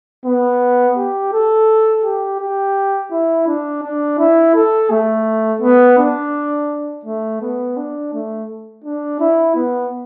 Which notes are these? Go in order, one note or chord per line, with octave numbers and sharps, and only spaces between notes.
B3
G4
A4
G4
G4
E4
D4
D4
E4
A4
A3
B3
D4
A3
B3
D4
A3
D4
E4
B3